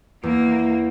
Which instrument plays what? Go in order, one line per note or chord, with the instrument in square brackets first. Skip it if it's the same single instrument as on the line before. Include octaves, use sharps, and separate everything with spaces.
[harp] E2 [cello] A#3